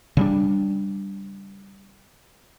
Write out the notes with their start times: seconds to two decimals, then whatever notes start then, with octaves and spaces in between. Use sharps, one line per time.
0.17 C#3 G3 D4